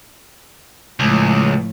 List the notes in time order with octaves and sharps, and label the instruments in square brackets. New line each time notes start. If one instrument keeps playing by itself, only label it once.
[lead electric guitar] C#2 [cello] A2 F3